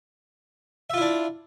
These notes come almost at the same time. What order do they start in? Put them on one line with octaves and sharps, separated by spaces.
E5 F4 E4 D4